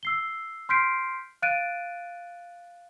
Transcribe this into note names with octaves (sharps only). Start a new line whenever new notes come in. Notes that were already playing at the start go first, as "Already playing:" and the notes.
E6 C7 G7
C6 F6 G6 B6 C7 D7
F5 F#6 A6 D7 D#7